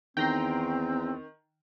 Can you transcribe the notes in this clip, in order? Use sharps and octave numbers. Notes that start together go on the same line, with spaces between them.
E2 D#3 C4 G5 A#5 C6